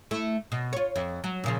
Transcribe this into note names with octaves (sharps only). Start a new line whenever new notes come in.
A3 E4
B2
F4 C#5
F2
F#3
A#2 C#3 F3